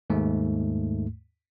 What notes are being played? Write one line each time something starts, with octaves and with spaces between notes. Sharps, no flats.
D#2 G#2 A3